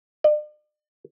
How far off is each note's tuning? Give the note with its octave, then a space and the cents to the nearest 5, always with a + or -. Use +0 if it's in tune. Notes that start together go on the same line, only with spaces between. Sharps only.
D5 +45